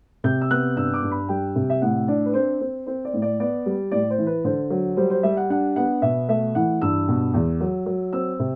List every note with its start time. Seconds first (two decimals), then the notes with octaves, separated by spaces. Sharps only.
0.24 C3 G6
0.41 E6
0.50 B3 F#6
0.76 G2 E6
0.94 D6
1.02 G2
1.12 B5
1.29 G3 G5
1.55 C3
1.70 E5
1.82 A2 F#5
2.08 D4 D5
2.26 B4
2.34 C4 C5
2.61 C4 C5
2.86 C4 C5
3.05 D5
3.14 A2
3.22 D5
3.40 B3 D5
3.66 G3
3.91 A2 D5
4.10 C5
4.18 E3
4.27 B4
4.45 D3 C5
4.70 F#3
4.97 G3 C5
5.10 C5
5.23 G3 E5
5.37 F#5
5.50 D4 F#5
5.76 B3 F#5
6.02 B2 E5
6.28 A3 E5
6.55 E3 F#5
6.82 G2 E6
7.08 B2
7.34 E2
7.60 F#3
7.86 F#3
8.13 C4 E6
8.39 C3